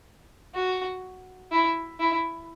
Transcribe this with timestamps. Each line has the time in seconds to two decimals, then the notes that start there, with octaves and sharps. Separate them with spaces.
0.55 F#4
1.51 E4
2.00 E4